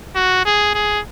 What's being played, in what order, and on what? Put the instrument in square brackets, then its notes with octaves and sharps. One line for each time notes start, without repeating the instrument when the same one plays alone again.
[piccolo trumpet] F#4
G#4
G#4